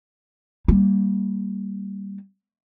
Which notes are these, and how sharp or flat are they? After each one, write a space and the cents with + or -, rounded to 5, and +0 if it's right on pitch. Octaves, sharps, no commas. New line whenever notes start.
G3 +0 A#3 +0